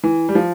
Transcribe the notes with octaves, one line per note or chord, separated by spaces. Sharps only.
E3
G3
F3